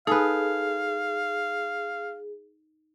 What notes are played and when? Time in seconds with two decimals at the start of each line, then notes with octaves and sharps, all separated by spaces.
0.07 D#4 G#4 A4 B4 F5 G#5 D#6